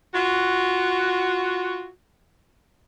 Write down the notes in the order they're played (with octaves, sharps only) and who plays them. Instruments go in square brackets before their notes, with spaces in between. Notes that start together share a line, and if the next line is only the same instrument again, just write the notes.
[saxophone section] F4 F#4